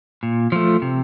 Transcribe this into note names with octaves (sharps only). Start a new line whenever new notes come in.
A#2
F3 A3
C3